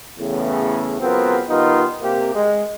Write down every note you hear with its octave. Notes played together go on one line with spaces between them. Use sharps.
E2 A2 C#3
C#2 F#3 B3 C4 F4 A#4
D#3 G3 B3 D#4 F4
C3 A#3 G4
G#3